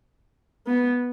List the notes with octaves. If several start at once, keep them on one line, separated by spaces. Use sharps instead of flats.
B3